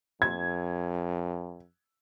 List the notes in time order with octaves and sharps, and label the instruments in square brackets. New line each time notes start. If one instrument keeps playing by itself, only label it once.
[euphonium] F2 [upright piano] G#6